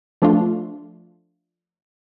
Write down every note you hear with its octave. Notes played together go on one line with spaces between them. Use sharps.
F3 A3 D4 F4